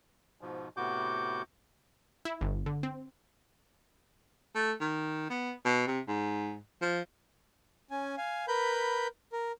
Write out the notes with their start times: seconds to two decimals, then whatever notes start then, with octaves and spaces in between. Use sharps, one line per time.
0.41 G#2 B2 F3
0.77 A2 C3 B3 F#4 D6 G6
2.25 E4
2.41 G1
2.66 D3
2.83 C4
4.55 A3
4.81 D#3
5.30 B3
5.65 B2
5.87 C3
6.08 G#2
6.82 F3
7.91 C#4 G#5
8.17 F5 G#5
8.48 A#4 B4 B5 G6
9.33 A#4